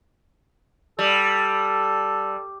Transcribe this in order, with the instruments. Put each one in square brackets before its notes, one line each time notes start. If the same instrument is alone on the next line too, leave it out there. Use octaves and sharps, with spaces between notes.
[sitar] G3 [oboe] A4